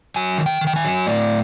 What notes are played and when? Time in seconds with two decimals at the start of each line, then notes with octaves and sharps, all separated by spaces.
0.16 F#3 G#5
0.38 D#3
0.46 G5
0.61 D#3
0.67 G5
0.76 G#5
0.84 F#3
1.07 A2 D5